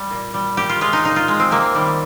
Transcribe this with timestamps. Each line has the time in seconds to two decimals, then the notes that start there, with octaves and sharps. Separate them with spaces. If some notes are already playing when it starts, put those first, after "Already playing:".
Already playing: G3
0.11 A#2
0.34 G3
0.57 A#2 G4
0.70 F4
0.81 G#3 F4
0.93 D#4
1.05 A#2 D#4
1.16 F4
1.28 G#3
1.40 C4
1.51 C3 A#3
1.75 D#3 G3